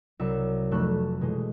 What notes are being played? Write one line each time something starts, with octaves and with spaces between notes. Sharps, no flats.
C2 F#3 E5 C#7
F1 A3 A4 C#6 F#6
B2 E3 G#3